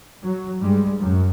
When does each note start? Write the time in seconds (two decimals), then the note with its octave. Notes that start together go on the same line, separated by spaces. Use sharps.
0.23 F#3
0.60 G2 G3 G#3
1.00 F#2